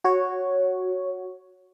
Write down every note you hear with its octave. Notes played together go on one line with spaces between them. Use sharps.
F#4 C#5